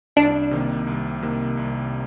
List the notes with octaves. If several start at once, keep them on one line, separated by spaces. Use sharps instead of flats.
C2 D4
C3 D#3 A#3
C2
C3 D#3 A#3
C2